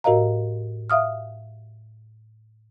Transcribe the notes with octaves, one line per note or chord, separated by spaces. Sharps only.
A2 F#4 A#4 D#5 F5 A#5
E5 F5 D#6 F6